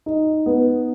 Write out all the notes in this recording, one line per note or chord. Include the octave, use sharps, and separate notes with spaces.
D#4
B3